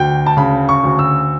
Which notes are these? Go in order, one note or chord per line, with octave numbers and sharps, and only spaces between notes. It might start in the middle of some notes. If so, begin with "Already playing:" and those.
Already playing: D2 G5
A5
C#3 B5
C#6
D2
E6